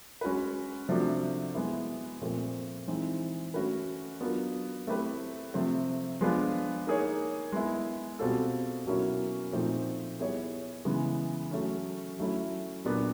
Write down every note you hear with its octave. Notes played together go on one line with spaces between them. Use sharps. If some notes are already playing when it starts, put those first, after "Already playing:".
G#3 C#4 F#4 B4
C3 F3 A3 D4 F#4
G#3 B3 E4
A#2 F3 A3 C4
E3 G#3 C4 D#4
A3 C#4 F#4 B4
F#3 B3 D4 F4 A#4
A3 C4 E4 G4 B4
C3 F3 A3 C4
F3 G#3 B3 D4 F4
A#3 D#4 G#4 C#5
G#3 B3 E4
B2 G3 C4 F4 A4
B2 F#3 A#3 C#4 E4
A#2 F3 A3 C4 D#4
G3 B3 E4 G#4 C#5
C#3 E3 G#3 B3
F#3 A3 C#4
F#3 A3 C#4 E4
A#2 F#3 B3 D4 F#4